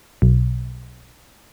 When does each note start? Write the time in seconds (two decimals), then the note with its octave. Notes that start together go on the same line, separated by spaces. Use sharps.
0.22 B1